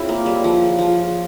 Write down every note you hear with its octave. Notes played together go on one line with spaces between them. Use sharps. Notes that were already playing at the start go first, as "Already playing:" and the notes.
Already playing: C4 E4 F4 G#4 C#5 F5
A#3
G3
F3
F3